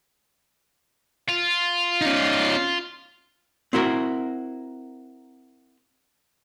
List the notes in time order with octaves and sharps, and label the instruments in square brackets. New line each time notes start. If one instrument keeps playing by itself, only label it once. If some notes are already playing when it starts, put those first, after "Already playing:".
[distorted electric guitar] F4
[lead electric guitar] C#4 D#4
[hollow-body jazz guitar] C4 E4 F#4 A#4